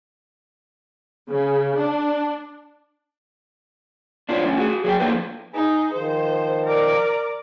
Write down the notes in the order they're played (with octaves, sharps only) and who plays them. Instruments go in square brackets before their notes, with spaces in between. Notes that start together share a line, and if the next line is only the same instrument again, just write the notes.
[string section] C#3
D4
[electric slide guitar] D4 E4 F4 C5 C#5
A3 C#4
F#4 G#4
F#3 G#4 G5
F3 A#3 E4 A4 B4 C5
[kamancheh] D#4 [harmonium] G#4 G#5
[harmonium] D#3 F3 [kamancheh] C5
[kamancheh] A#4 D5